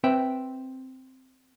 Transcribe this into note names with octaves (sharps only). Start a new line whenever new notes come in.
C4 B4 E5 G5